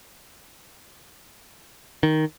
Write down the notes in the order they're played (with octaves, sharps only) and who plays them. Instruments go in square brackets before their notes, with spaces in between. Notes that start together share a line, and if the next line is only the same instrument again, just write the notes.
[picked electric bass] D#3